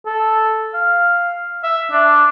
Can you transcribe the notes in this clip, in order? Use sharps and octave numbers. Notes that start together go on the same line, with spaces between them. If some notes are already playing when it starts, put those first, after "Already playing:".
A4
F5
E5
D4